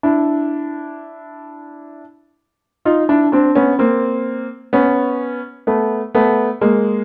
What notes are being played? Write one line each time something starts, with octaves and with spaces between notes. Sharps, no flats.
D4 E4
D#4 F4
D4 E4
C4 D4
B3 C#4
A#3 C4
B3 C#4
A3 B3
A3 B3
G#3 A#3